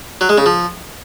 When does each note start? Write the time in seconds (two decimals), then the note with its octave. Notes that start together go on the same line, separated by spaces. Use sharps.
0.21 F#3
0.29 G#3
0.38 C#3
0.46 F3